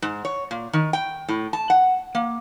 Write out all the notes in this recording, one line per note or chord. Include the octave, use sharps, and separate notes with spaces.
G#2
C#5
A#2
D#3
G5
A2
A5
F#5
A#3